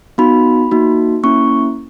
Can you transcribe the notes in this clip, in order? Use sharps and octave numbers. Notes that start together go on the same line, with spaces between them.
B3 D#4 F#4 B5
A#3 D#4 F#4
A#3 C#4 E4 C#6